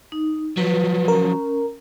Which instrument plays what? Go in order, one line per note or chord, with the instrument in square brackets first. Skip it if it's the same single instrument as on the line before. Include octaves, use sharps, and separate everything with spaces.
[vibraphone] D#4
[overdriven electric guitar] F3 F#3 [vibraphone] B4
[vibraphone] C#4 [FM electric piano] A#4